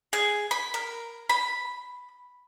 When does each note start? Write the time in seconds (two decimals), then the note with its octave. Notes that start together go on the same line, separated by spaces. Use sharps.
0.13 G#4
0.51 B5
0.74 A#4
1.29 B5